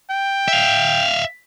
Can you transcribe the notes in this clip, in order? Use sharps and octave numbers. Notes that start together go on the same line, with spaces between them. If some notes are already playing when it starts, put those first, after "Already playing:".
G5
E5 F5